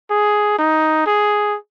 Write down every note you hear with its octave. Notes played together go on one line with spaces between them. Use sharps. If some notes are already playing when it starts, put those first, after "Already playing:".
G#4
D#4
G#4